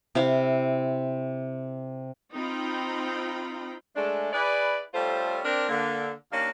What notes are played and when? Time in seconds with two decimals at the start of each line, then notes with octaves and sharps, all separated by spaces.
0.15 C3 E4 F5
2.34 C4 D#4 F4 G5 A#5 B5
3.95 G#3 A3 D4
4.32 E4 G#4 B4 D5
4.93 G3 A3 C#4 F4 A4 C5
5.44 C4 D4 A#4
5.69 D3 A#3
6.31 D#2 A#3 C#4 D4 F5